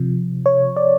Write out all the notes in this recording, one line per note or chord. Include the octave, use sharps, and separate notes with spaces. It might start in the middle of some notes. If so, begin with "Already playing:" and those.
Already playing: C3 F3
C#5
D5